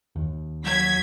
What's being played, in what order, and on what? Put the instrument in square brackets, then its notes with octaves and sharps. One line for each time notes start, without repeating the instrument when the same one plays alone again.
[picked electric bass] D#2
[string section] F#3 G#6 B6